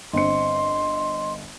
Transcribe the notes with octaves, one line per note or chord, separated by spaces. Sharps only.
G1 C4 D#5 C6 C#7